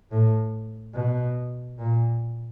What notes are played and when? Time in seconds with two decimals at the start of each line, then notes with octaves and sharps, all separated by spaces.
0.11 A2
0.94 B2
1.79 A#2